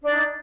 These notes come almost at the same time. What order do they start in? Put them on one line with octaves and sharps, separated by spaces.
D4 D5 D#4